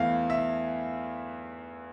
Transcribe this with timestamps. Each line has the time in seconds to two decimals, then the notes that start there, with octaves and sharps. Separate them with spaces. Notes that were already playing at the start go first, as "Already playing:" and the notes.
Already playing: E2 E3 A3 F5
0.30 E5